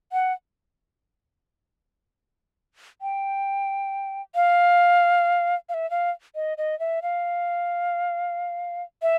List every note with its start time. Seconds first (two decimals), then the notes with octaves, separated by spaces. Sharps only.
0.12 F#5
3.02 G5
4.35 F5
5.69 F5
5.74 E5
5.91 F5
6.35 D#5
6.58 D#5
6.80 E5
7.03 F5
9.02 E5